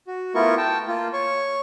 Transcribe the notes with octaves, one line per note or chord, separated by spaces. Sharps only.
F#4
A3 B3 E4 F4 A#4 C#6
G5 A5
A#3 F4
C#5 C#6